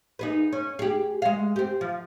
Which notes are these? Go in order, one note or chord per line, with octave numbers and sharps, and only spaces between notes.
D#4 G#4 B4
C#4
G4 G#4
G#3 F5
C4 G4
F3